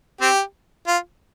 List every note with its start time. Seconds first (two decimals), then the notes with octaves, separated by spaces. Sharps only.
0.21 C4 G4
0.87 F4